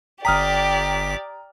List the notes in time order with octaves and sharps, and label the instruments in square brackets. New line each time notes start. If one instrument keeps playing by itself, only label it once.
[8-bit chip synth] G1 B6 [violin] G4 D5 [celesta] G5 [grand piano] A#5 D#6 F6